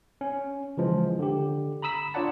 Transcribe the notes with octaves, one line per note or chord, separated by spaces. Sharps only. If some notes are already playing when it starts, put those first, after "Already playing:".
C#4
C#3 E3 F3 G#3
D3 G4
A#5 B5 D#6 E6 B6
D4 F4 C#5 D5 F#5 A5